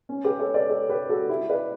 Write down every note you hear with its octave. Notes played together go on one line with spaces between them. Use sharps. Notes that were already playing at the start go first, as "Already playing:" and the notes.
C#4
G4 B4
A4 C#5
B4 D5
A4 C#5
G4 B4
F#4 A4
E4 G4
B4 D5